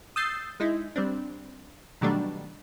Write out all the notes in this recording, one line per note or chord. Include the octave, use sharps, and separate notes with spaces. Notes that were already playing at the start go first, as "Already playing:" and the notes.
D#6 E6 G6 A6 C7
G#3 D#4 E4
G3 C4 D4
B2 D#3 F#3 G3 A3 D4